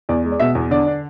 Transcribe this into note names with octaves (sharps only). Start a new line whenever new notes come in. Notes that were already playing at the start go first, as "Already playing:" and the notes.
E2 D5
G#3
D5
B2 E5
E2
D3 D5
D4